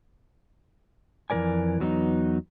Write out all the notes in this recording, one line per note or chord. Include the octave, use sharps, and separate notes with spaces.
F2 E3 F3 A#4 D5 G#5
E2 F#3 B3 D4 D#4